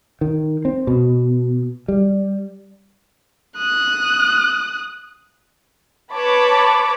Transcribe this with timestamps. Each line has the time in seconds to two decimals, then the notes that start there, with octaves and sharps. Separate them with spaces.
0.21 D#3
0.65 C4
0.87 B2
1.88 G3
3.57 D#6 F#6
6.13 B4 C#5 A5 B5 D6